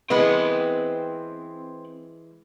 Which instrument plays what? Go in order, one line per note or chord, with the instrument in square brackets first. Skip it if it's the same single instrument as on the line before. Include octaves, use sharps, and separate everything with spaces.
[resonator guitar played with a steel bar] E3 G#3 [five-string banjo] B3 [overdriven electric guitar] C4 B5